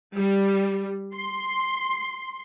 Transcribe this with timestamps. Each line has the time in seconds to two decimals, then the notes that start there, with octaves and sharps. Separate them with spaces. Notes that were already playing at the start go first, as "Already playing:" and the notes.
0.14 G3
1.15 C6